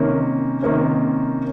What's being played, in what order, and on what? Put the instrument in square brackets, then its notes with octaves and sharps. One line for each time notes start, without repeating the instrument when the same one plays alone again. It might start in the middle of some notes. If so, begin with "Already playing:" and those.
Already playing: [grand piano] C3 D#3 A#3 C#4
C3 D#3 A#3 C#4